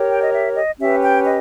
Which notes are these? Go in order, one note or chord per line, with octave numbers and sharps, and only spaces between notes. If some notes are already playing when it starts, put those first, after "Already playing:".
Already playing: G4 A#4 C#5
G5
D#5
E5
D#5
C#4 G4 B4 E5
G5
D#5